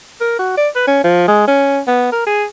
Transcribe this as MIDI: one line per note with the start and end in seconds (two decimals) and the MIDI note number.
0.21 0.39 70
0.39 0.54 66
0.57 0.69 74
0.75 0.86 71
0.87 1.04 61
1.04 1.26 53
1.28 1.43 56
1.47 1.80 61
1.87 2.08 59
2.12 2.23 70
2.26 2.45 68